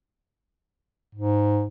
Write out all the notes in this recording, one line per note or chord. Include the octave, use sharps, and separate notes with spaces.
G#2